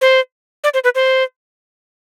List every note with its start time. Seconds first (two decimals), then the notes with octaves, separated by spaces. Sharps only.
0.01 C5
0.64 D5
0.74 C5
0.84 B4
0.95 C5